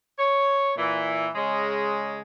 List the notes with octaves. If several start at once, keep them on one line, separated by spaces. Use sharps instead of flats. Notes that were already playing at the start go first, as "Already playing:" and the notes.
C#5
A#2 E3
C#3 G#3